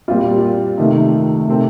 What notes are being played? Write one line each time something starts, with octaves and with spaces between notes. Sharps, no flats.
A#2 G3 C4 F4
C3 D#3 A3 D#4
C3 D#3 A3 C4